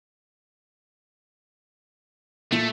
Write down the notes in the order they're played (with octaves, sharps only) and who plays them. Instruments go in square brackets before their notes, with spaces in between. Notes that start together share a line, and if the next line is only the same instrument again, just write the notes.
[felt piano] A#2 [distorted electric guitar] A3